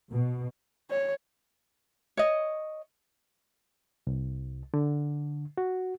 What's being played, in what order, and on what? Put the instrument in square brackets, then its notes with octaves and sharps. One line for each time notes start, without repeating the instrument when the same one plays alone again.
[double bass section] B2
[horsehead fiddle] C#5
[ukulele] C#5 D#5
[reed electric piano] C2
D3
F#4